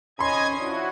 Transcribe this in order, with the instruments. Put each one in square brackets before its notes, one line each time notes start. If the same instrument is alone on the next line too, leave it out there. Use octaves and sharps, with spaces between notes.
[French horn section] F2 D#3 C#4 [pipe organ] D#5 G#5 G#6 [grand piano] B5 C6
[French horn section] F2 D4 [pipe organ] E4 F#4